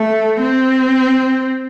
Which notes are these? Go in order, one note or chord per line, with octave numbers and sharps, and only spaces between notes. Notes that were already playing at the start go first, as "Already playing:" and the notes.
Already playing: A3
C4